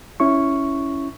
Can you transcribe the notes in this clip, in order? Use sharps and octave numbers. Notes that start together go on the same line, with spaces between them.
C#4 E4 C#6